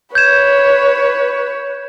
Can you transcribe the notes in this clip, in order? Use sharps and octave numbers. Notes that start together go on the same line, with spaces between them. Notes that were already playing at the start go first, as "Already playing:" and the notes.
B4 C#5 G6 G#6 E7